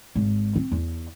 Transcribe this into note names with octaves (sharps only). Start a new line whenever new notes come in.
G#1
C4
E2